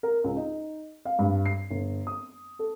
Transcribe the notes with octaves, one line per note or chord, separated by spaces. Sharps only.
A#4
C#2
D#4
F5
G2
C7
G1
D#6
A4